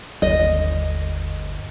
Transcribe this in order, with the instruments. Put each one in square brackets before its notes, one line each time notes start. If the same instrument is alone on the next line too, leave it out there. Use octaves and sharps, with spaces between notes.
[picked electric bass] G1 [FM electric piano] D#2 [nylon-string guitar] D#5